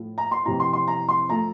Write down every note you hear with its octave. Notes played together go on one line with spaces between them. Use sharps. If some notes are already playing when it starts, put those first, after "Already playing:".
Already playing: A2 F3 A3
A#5
C6
F2 C3 E3 A#5
C6
C6
A#5
C6
F3 A3 A#5